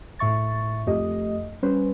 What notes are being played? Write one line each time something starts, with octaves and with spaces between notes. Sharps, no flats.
A2 E5 C#6 A6
F2 A3 G4 D#5
G3 C#4 B4 C5